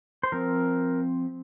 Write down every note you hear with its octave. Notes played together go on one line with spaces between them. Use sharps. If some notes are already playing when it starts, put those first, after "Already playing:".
C5
F3 C4 A#4